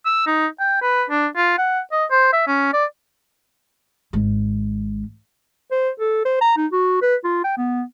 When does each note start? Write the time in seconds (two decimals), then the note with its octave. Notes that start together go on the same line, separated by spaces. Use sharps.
0.06 E6
0.27 D#4
0.60 G5
0.82 B4
1.10 D4
1.36 F4
1.58 F#5
1.92 D#5
2.11 C5
2.33 E5
2.48 C#4
2.73 D5
4.13 G#1 G#3
5.71 C5
6.00 A4
6.25 C5
6.41 A#5
6.57 D#4
6.72 F#4
7.02 B4
7.24 F4
7.44 G5
7.57 B3